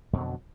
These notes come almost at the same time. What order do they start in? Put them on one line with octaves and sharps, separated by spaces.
F2 B2 F#3 D3